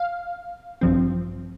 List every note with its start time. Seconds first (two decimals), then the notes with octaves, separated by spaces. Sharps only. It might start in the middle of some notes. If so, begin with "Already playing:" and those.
Already playing: F5
0.81 A1 G2 F3 C4